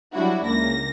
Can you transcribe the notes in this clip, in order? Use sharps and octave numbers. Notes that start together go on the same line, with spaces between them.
F#3 G3 D4 E4 F#4
C#2 A#3 A#6